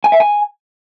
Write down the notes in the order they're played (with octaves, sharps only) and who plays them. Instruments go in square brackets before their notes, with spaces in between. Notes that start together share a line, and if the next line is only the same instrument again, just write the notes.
[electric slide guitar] G#5
E5
G#5